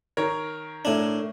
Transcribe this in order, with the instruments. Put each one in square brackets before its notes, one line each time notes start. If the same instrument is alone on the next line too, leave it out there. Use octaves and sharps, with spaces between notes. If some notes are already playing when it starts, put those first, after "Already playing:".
[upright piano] D#3 A#4 C#5
[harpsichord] A2 D4